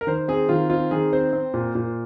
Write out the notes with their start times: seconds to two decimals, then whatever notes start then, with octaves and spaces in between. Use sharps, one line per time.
0.01 A#4
0.07 D#3 C5
0.28 C4 G#4
0.49 D#3 F4
0.70 C4 F4
0.91 D#3 G#4
1.13 C4 C5
1.33 C4
1.54 A#2
1.75 A#2